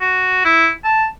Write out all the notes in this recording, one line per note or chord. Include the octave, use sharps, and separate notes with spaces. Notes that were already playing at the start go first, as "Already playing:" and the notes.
F#4
E4
A5